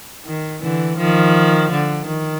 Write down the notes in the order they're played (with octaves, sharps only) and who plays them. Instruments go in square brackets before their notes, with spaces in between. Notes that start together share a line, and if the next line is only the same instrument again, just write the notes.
[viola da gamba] D#3
D3 E3
D#3 F3
D3
D#3